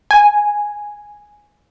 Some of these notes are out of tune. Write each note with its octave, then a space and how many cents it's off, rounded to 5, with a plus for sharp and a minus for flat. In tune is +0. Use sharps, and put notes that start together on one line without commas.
G#5 +0